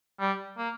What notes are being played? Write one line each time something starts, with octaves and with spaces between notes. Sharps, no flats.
G3
A#3